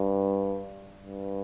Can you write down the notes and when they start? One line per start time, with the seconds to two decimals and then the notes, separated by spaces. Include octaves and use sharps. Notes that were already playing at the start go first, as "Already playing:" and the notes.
Already playing: G2
1.01 G2